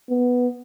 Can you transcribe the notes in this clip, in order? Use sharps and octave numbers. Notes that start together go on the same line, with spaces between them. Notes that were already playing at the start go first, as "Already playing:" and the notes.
B3